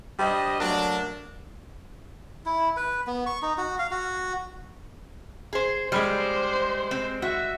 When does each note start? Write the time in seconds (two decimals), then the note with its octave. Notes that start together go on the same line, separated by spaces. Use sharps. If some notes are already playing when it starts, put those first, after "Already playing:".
0.20 G3 D4 C5 D#5
0.60 F#3 A3 A#3 D4
2.46 E4
2.77 B4
3.07 B3
3.26 C#6
3.42 D#4
3.58 F#4
3.79 F5
3.91 F#4
5.53 G#4 C5
5.92 G3 G#3 C5 B5 F6
6.91 C4
7.22 F#4 E5